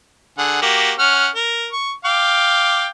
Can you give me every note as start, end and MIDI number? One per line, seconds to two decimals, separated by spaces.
0.38 0.58 50
0.38 0.58 68
0.38 0.58 78
0.62 0.92 58
0.62 0.92 66
0.62 0.92 67
0.99 1.28 61
0.99 1.28 78
0.99 1.28 89
1.35 1.68 70
1.72 1.92 85
2.05 2.87 77
2.05 2.87 79
2.05 2.87 86